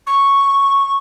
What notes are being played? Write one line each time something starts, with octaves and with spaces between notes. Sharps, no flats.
C#6